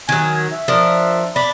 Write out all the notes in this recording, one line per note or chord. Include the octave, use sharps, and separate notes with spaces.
D#3 F#3 G#5
E5
F3 D4 A#4
D4 B5